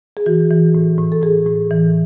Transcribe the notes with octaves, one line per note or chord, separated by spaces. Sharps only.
G#4
E3 F#4
E3
A2
A2
A4
A2 G#4
A2
E3